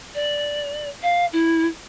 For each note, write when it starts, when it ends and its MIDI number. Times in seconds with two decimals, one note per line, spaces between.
0.14 0.89 74
1.02 1.25 77
1.33 1.66 64